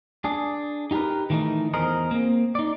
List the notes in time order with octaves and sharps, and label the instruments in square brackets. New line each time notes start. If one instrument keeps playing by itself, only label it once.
[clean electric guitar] D4 G#4
D#4 G4 G#4 A#4 B4
D#3 E3 A3 C#4 D#4
E2 G#4 A#4 C5 D#5
A#3 C4
D#4 D5